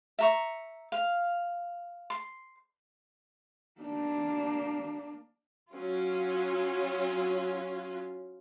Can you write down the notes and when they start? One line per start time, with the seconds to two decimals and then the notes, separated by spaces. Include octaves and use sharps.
0.19 E5 A#5 C#6
0.92 F5
2.10 C6
3.81 A#3 D4
5.72 F#3 C#4 F4